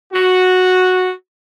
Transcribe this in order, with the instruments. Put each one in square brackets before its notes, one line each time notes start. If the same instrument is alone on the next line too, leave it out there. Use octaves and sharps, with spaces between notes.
[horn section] F#4